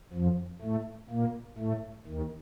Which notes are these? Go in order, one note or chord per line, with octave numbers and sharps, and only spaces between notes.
F2 F3
A2 A3
A#2 A#3
A2 A3
D#2 D#3